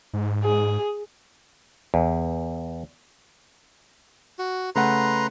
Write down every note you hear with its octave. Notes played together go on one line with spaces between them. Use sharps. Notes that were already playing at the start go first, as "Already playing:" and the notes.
G#2
G#4
E2
F#4
C#3 A3 B4 F#5 A#5 C6